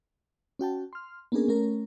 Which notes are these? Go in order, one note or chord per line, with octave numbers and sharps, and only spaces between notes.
C#4 F#4 G5 A5
C6 F6
A#3 B3 C#4 D4 G#4 A#4
A3 C#4 A#4